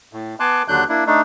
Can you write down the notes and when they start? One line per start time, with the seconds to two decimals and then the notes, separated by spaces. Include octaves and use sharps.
0.13 A2
0.40 B3 G#5 A5 C6 D6 F#6
0.68 D#2 D3 F#3 D4 F#6 G6
0.89 A#3 D4 E4
1.07 A3 D4 D#4